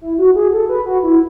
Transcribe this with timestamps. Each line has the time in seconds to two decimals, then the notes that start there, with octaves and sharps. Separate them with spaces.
0.01 E4
0.18 F#4
0.36 G#4
0.53 A4
0.69 B4
0.86 F#4
1.03 E4